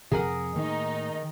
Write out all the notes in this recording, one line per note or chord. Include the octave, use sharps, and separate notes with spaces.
F2 C3 G#4 A#4 F#5
A2 D#3 A#3 D#4